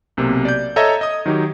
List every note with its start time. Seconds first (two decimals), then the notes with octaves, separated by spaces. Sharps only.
0.17 B1 C3 A#3
0.45 D5 G6
0.76 A4 C#5 D#5 E5 A#5 G#6
1.01 D#5 D#6
1.26 D#3 F#3 D#4 G4